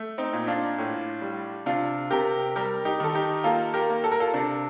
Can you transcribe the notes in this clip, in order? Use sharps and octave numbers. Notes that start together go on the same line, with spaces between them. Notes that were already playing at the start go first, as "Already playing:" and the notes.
Already playing: A3
C4 D#4
A#2
D4 F4
A2
G3
C3 D4 F4
C3 G4 A#4
G3 G4 A#4
D#4 G4
D#3 A4
D#4 G4
A#3 F4 A4
G4 A#4
A#3
A4
A#4
F4 A4
C3 D4